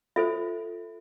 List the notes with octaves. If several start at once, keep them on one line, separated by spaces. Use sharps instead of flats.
F4 A4 C5 E5